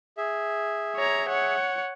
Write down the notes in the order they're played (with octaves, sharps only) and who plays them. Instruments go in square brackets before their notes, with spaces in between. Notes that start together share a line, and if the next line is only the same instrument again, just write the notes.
[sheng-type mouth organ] G#4 E5
[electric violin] C#5 A#5
C#5 F#5